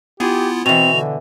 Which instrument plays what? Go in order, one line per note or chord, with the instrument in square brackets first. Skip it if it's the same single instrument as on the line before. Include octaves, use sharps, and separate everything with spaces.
[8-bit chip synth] B3 E4 F4 [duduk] G4 [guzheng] G#4
[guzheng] B2 E3 [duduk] C4 [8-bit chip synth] F#4 [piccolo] F7
[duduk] D3